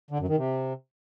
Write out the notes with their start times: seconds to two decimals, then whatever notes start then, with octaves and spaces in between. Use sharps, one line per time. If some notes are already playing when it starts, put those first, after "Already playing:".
0.11 D3
0.19 F#2
0.28 D#3
0.37 C3